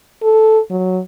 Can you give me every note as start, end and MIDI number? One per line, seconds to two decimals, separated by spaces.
0.22 0.59 69
0.70 1.00 54